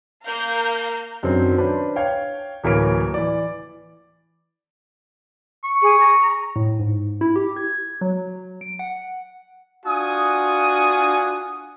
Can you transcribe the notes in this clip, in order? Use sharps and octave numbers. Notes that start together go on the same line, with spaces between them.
A#3 A#4 F5 A#5 G6
F#2 D#3 F#3 C4 D4
C#4 D4 B4 C5
C#5 F5 G5
D1 E3 A#3 A#4 C#5 D7
E3 D5
C#6
G#4
A#5
A2
G#2
E4
G4
G#6
F#3
D7
F#5
D4 F4 F#4 G#5 D#6